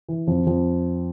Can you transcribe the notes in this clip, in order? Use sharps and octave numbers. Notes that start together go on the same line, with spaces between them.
E3
F2 F3
F2 F3